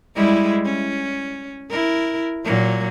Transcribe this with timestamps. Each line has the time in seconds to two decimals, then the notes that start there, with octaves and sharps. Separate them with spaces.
0.15 G3 G#3 E4
0.65 C#4
1.70 E4 A#4
2.44 A#2 F#3 A#3